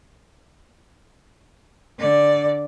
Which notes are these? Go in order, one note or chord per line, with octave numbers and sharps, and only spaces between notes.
D3 D5